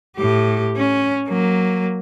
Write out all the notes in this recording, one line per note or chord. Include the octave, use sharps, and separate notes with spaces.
A2 G4
C#4
F#3 A#3